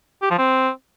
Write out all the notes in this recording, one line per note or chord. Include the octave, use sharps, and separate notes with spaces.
G4
F3
C4